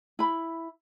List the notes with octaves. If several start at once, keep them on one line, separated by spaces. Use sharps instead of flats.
E4 B5